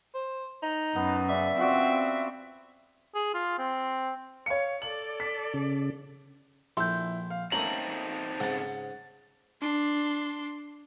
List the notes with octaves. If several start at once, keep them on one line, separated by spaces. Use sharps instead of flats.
C5
D#4
F#2 B3
C#3 D5 E5
C4 F4 F#4 D5
G#4
F4
C4
C#5 F5 C#7
A4 D5 F#7
B6
C#3
A#1 E4 A4 C6 G6
F5
A3 A#3 C4 C#4 D#4 A4 A#5 F#7
G#2 C#3 F#5 A6
D4 C6